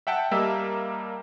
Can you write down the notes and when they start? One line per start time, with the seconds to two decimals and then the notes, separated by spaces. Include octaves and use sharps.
0.07 E5 F#5 G5 A5
0.31 G3 A#3 D#5 E5 A5 E6